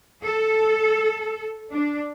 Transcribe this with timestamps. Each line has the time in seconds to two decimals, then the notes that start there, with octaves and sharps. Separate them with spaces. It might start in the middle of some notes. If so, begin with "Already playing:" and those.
0.23 A4
1.72 D4